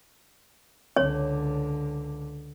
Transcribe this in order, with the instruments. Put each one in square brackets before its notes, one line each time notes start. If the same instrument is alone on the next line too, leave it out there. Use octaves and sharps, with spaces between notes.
[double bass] C#2 D3 [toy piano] C#5